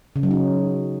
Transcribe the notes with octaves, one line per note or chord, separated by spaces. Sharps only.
C#3
F#3
D#4